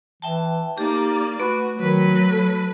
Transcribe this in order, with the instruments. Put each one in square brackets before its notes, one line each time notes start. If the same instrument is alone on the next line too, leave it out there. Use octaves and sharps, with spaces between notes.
[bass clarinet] E3 [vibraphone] E5 G5 A5
[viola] A#3 D5 [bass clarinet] D#4 [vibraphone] G4
[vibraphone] A3 [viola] F#4 [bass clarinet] B4
[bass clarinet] D#3 [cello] F#3 [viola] B4
[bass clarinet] A4